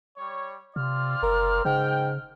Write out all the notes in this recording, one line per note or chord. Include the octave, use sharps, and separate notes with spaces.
G3 C#5
C3 C4 F4 D5 F6
F#1 A#4
G#2 C#3 G5